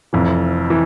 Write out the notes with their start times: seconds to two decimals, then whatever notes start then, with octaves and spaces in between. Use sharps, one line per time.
0.13 F1 F2 E3
0.70 E3